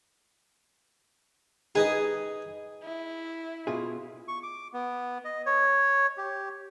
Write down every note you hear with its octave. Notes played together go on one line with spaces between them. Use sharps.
D#4 G#4 B4 D#5
E4
B2 F4 G#4
C#6
D6
B3
D#5
C#5
G4